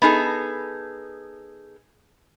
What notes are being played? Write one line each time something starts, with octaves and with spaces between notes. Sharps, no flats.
B3 D#4 G#4 A4